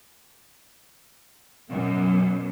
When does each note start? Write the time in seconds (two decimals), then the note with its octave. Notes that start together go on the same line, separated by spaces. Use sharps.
1.70 F#2 B2